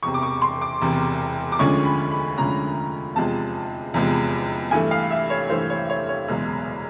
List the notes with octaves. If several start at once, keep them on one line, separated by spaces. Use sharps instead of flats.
E1 E2 C3 C#6
D6
C#6
C6
D6
E1 E2 C3
D6
D2 D3 F3 G#3 C#4 C#6
B5
B5
D2 D3 F3 G#3 C#4 A#5
F1 E2 C3 F3 G#3 A5
F1 E2 C3 F3 G#3
G2 E3 A3 G#5
F5
E5
C#5
G2 E3 A3 C5
C#5
C#5
C#5
F#1 E2 B2 G#3